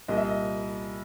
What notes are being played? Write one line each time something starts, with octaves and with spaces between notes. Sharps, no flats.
C2 A#2 G3 D#5
E5
D#5